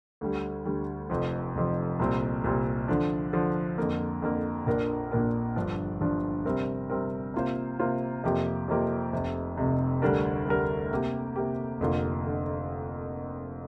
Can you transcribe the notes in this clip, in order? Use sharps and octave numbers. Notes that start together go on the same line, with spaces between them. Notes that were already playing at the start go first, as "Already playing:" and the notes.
D2 D3 G3
D2 D3 G3
F1 F2 F3
F1 F2 F3
C2 A#2 G3 C4
C2 A#2 G3 C4
D3 F3 D4
D3 F3 D4
F2 D3 A#3
F2 D3 A#3
A#1 A#2 A#3 D4 A#4
A#1 A#2 A#3 D4 A#4
G1 G2 F3 D4
G1 G2 F3 D4
C3 G3 C4 A#4
C3 G3 C4 A#4
C3 A#3 F4 C5
C3 A#3 F4 C5
F2 C3 F3 A#3 G4
F2 C3 F3 A#3 G4
F1 F2 C3
F1 F2 C3
D2 D3 G3 D4 A#4
D2 D3 G3 D4 A#4
C3 A#3 G4
C3 A#3 G4
F1 F2 D3 A#3 F4
D3